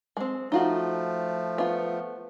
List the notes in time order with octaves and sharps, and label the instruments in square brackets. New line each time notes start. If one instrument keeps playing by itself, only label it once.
[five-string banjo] G#3 C4
[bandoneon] F3 A3 [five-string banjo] D#4 F4 F#4
[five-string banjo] B3 F4